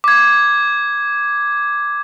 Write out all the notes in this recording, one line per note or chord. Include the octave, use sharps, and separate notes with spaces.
D6 G#6